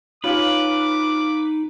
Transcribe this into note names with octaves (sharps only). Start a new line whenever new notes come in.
C#4 D#4 F4 B4 D6